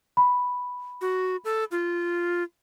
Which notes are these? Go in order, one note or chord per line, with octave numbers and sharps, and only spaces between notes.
B5
F#4
A4
F4